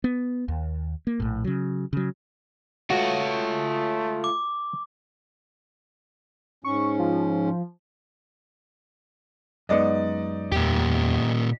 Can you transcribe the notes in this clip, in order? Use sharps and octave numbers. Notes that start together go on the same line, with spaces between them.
B3
D#2
A#3
A#1 A2
C#3 F#3
C#3 F#3
A3 F4 F#4 C#5
D6
G#2 C#4 C#6
F3
F#2 G#3 B3 D#4 D5 D#5
E2 A#2 G4